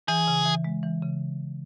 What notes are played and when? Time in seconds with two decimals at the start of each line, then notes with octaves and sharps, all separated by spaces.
0.08 E3 G#4
0.28 C#3
0.46 E3
0.64 G#3
0.83 E3
1.02 C#3